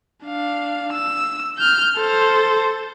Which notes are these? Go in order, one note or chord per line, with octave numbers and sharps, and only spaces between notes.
D4 F5
E6
F6 G6
A4 C5